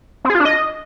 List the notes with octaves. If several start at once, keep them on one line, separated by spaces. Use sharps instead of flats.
C4
G#4
F4
D4
D#5